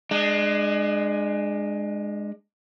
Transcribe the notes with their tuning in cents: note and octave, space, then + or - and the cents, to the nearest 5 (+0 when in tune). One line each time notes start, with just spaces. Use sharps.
G#3 +0 D4 +35